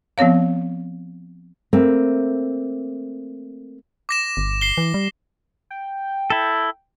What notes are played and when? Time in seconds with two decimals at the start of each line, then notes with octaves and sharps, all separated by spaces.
0.18 F3 B3 C4 C#5 F5
1.73 A3 A#3 C4
4.09 D6 A#6 E7
4.37 G1
4.61 C7 G7
4.78 E3
4.94 G3
5.70 G5
6.30 E4 A4